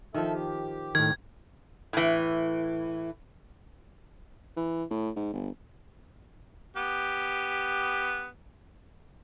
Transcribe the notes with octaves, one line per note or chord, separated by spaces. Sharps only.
D#3 F3 A4 E5
G4
A2 D#3 A#4 G#6
A2 E3
E3
A2
G#2
G1
B3 G4